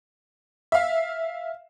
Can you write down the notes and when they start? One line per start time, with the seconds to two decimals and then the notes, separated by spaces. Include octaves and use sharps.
0.72 E5 F5